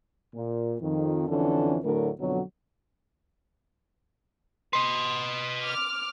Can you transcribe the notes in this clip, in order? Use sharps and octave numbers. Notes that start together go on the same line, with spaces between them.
A#2
F2 D#3
F2 D3 E3 C#4 A4
D2 A2 D3 F#3 A#4
F2 B2 D3 F#3
B4 D#5 C6
D6 F6